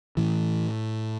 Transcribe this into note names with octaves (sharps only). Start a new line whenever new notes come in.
A2 E3